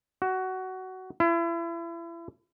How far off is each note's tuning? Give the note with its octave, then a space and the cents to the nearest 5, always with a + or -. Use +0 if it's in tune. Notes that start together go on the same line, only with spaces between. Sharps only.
F#4 +15
E4 +35